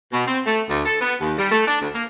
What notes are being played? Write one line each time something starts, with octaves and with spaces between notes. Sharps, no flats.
B2
C4
A3
D2
A4
B3
D#2
G3
A3
D4
D2
A#3